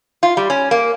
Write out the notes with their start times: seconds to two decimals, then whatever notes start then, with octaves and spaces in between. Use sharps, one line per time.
0.23 F4
0.37 G3
0.50 C#4
0.71 A#3